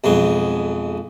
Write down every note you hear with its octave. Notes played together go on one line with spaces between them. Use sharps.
B1 F2 G#3